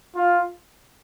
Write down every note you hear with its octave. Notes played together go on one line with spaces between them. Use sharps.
F4